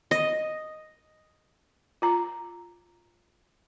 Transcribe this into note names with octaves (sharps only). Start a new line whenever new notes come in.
D#5
F4 A#5